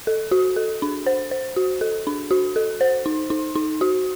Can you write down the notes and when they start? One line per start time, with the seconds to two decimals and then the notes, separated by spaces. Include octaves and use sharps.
0.07 A4
0.31 F#4
0.56 A4
0.82 D4
1.06 C5
1.31 C5
1.56 F#4
1.81 A4
2.07 D4
2.31 F#4
2.56 A4
2.81 C5
3.06 D#4
3.30 D#4
3.55 D#4
3.81 F#4